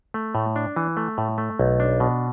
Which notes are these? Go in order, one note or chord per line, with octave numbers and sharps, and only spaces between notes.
A3
A2
D4
E3
A3
A2
A3
B1
D4
B2